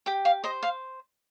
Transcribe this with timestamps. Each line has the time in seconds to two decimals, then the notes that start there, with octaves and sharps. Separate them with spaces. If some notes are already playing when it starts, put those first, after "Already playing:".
0.06 G4 G5
0.25 F5
0.44 C5 D#5
0.63 F5